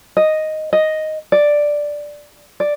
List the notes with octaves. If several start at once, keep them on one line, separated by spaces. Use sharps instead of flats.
D#5
D#5
D5
D5